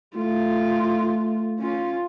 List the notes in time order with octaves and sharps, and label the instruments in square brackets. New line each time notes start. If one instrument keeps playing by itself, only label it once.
[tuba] A3 [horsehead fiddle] F4
[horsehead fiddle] C#4 F4